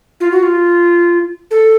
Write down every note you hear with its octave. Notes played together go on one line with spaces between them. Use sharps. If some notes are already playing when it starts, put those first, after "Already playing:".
F4
F#4
F4
A4